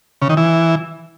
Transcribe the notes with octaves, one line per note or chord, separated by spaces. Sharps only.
C#3
D#3
E3